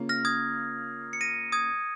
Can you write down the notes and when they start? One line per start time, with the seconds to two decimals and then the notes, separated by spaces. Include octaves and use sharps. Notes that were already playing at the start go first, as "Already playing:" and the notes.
Already playing: C#3 A#3 C#4 F4
0.09 F6 A#6
0.25 D#6 G#6
1.13 C#7
1.21 A#6 D#7
1.52 D#6 G#6